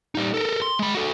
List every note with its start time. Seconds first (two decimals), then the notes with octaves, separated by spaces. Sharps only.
0.15 G3 D#4
0.34 A4 A#4
0.62 C6
0.79 G#3 B5
0.95 F#4 A4